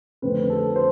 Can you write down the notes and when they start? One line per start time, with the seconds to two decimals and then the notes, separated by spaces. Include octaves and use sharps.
0.22 F2 D3 A3 C4 B4
0.50 A4
0.76 C5